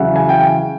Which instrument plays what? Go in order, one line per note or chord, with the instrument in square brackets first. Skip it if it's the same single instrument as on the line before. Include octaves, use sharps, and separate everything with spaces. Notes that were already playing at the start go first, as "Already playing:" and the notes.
Already playing: [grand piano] E2 C#3 F#3 E5 F#5
G#5
G5